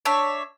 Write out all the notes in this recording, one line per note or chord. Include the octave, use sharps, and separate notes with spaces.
D4 C#5 E5